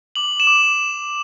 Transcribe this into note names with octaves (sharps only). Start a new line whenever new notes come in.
D6 F#7
E7
D6